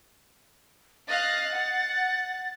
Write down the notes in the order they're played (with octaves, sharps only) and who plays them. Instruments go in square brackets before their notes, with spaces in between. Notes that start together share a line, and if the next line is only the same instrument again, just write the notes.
[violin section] D#5 F5 F#6 [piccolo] A6
[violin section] F#5